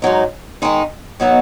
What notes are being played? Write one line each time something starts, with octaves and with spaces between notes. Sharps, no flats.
G#2 F#3 D#4
D#3 G#3 D#4
B2 F#3 B3 D#4